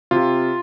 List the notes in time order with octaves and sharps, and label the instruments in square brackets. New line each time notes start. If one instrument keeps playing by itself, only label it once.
[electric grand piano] C3 F4